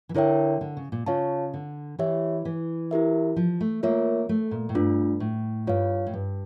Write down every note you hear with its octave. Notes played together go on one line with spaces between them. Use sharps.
E3
D3 E4 A#4 C#5 E5 G5
D3
C#3
A#2
C#3 F4 C#5 F5 A5
D3
E3 G4 C#5 E5
E3
E4 G4 A#4 E5
F3
A3
A#3 F4 A#4 C#5 E5
A3
A#2
A2
G2 A3 D4 F4
A2
G2 F4 C#5 F5
A2
G2